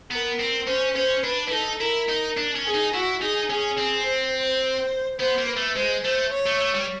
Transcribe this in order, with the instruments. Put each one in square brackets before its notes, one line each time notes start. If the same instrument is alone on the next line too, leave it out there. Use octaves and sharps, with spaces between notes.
[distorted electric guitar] B3 [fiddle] A#4
[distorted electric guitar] C4
[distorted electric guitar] C#4 [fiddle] C5
[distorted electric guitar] C#4 [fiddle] C5
[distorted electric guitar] D4 [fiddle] B4
[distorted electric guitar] E4
[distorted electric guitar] D#4 [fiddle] A4
[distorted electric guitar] E4 [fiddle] A#4
[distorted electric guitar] D#4
D4
C#4
[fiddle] G#4
[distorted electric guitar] D#4
[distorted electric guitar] E4 [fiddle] F#4
[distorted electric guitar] D#4 [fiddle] G#4
[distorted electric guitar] C#4 [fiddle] G#4
[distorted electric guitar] C4
[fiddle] C5
[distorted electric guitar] B3 [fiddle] C5
[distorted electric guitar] A#3
[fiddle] B4
[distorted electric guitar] A3
[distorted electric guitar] G#3 [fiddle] C5
[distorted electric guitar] A3 [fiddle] C5
[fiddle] C#5
[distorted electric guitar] A3
A3
G3